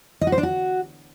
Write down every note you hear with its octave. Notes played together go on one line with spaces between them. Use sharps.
D#5
F#4
C5
D4
F#4